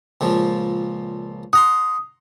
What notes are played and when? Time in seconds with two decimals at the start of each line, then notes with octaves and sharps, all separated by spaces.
0.21 C#2 A#2 F3
1.53 F#5 A#5 C6 D#6